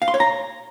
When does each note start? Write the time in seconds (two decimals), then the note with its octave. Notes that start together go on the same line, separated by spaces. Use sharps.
0.02 F5
0.08 C6
0.14 C#5
0.20 A#5